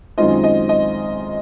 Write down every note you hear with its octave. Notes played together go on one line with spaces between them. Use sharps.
F#2 D#3 G#3 C4 F4 D#5
D#5
D#5